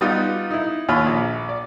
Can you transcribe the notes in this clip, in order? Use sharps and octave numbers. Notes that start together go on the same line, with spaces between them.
G3 B3 D#4 F4
D#4 E4
D#2 F4 C#5 B5 F6
A#1
D5